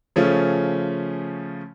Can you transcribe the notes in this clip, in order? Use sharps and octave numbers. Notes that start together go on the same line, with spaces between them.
C#3 F3 A3 C#4